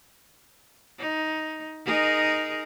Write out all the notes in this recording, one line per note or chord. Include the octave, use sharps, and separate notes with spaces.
D#4
D#4 G#4 A#4